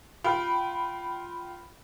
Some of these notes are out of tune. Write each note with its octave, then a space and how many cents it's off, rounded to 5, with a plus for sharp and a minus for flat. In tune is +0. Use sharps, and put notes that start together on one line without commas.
F4 +0 G5 -25 B5 +0